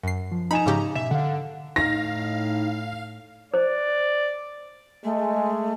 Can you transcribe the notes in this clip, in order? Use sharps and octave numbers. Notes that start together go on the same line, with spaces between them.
F#2 C7
F3
D#4 G#5 A#5 B5 E7
G#2 C#3 G4
B2 E5 E7
D3 F5 F#5
A2 D#4 F5 A#6
C5 D5
G#3 A3